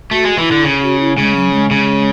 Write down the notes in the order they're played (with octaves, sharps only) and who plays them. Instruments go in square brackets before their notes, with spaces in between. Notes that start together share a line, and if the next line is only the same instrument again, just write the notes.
[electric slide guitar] A3 [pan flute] F#4
[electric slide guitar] G#3
[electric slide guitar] E3 [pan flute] E4
[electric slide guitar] D3
C#3
[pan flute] F#4
E4
[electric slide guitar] C#3 [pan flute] G#3
[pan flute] F#3
G#3
[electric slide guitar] C#3